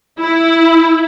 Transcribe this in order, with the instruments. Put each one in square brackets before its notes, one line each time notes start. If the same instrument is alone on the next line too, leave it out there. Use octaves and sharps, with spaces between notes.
[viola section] E4